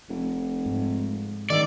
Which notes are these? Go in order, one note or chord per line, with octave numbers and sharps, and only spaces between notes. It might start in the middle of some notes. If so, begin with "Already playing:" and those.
F1
G#2
D#3 D5 E6